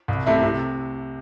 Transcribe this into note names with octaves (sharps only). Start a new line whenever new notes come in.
C2
C3 A3 E4
C3